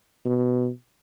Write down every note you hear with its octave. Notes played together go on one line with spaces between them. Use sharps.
B2